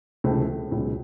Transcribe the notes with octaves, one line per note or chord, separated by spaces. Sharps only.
C#2 C3 E3 A3 C4
C#2 B2 F#3